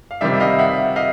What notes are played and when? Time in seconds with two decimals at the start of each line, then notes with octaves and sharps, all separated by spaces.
0.11 F5
0.21 C3 D#3 G3 D5 E5
0.40 D#5 F5
0.59 E5 F#5
0.96 D#5 F5